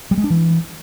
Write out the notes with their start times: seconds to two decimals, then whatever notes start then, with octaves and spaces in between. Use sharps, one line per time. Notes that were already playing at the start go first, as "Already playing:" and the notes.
0.11 G3
0.18 G#3
0.24 D4
0.30 E3